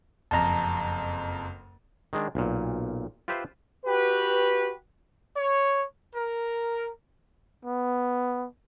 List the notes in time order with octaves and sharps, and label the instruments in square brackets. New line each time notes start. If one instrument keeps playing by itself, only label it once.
[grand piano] F#1 F2 [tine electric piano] A5 A#5
[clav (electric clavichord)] D#3 G#3 D4
B1 A#2
F4 G4 B4 C5 E5
[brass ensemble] F#4 G4 B4
[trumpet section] C#5
A#4
[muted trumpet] B3